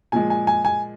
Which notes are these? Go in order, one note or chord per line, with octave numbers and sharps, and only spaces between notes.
A#2 F3 G#3 G#5
G#5
G#5
G#5